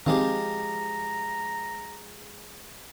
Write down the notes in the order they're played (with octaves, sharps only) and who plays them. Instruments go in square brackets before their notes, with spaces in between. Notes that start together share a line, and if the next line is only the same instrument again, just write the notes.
[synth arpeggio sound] D#3 C4 [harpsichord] F3 G#3 G4 [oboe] A#5